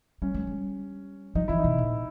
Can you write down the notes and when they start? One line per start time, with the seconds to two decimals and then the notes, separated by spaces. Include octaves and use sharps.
0.22 G3 C#4
0.35 G#3
0.47 G3
1.35 F3 D#4
1.48 E3 E4
1.59 D#4
1.64 B2
1.78 A#2